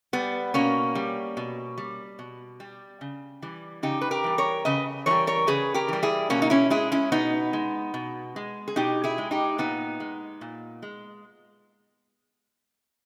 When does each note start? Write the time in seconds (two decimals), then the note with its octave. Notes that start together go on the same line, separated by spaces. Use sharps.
0.13 G3 B3
0.54 B2 A#3 C#4
0.95 G3
1.37 B2
1.78 G3
2.19 B2
2.60 G3
3.01 C#3
3.42 E3 G3
3.83 C#3 D#4 G4
4.01 B4
4.11 G4 A#4
4.24 E3 G3
4.38 A#4 C#5
4.65 C#3 B4 D#5
5.06 E3 G3 A#4 C#5
5.27 A#4 C#5
5.47 C#3 G#4 B4
5.74 G4 A#4
5.88 E3 G3
6.03 E4 G#4
6.30 B2 A#3 C#4
6.42 D#4
6.50 C#4 E4
6.70 G#3 E4 G#4
6.92 C#4 E4
7.12 B2 B3 D#4
7.53 G#3
7.94 B2
8.36 G#3
8.68 G#4
8.76 B2 D#4 G4
9.04 E4 G#4
9.18 G#3
9.31 D#4 G4
9.58 A#2 B3 D#4
10.00 G#3
10.41 A#2
10.83 G#3